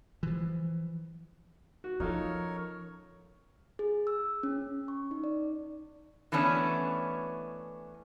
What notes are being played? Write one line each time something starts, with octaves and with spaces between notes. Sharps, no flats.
E3 F3
F#4
F3 C#4 D#4 F4 A4 A#4 C#5
G#4
E6
C#4
C#6
D#4
D5
E3 A3 B3 C#4 D4